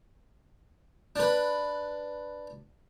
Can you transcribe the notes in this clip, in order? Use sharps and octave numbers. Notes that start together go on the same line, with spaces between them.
D4 B4